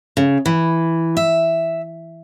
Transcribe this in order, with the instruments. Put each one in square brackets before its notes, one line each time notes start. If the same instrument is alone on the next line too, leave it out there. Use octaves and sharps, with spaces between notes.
[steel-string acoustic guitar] C#3
E3
E5